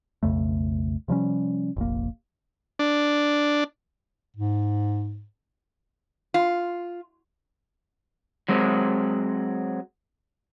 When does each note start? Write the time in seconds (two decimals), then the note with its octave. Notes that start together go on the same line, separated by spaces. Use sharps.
0.23 B1 F2 C#3 A3
1.08 C3 F3 G3 C#4
1.76 F1 A#1 A#3
2.79 D4
4.36 G#2
6.34 F4
8.49 F#3 G#3 C4